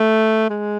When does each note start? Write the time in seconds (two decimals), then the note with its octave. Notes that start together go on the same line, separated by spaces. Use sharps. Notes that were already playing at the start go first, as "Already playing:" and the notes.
Already playing: A3
0.50 G#3